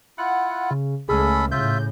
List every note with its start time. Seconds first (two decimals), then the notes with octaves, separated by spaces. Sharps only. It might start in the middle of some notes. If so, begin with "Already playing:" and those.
0.18 E4 F4 F#5
0.71 C#3
1.09 C#2 A3 C#4 G#4 A4 B5
1.52 A2 C#3 F4 E5 G6